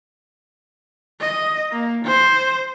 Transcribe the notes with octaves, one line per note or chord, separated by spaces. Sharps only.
D#5
A#3
C5